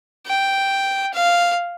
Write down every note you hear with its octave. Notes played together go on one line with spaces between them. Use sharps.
G5
F5